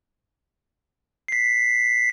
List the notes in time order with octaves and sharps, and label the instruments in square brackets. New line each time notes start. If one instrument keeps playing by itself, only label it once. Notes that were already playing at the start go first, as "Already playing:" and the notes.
[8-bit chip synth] B6 C7